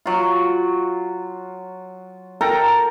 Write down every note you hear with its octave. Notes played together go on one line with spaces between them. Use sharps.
F#3 F4
A4 A#4 G5 A#5